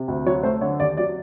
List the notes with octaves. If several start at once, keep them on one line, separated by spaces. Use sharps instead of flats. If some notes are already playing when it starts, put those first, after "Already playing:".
Already playing: C3
D2
F#3 C#5
A3 C5
D3 C#5
D#2 D5
F#3 D5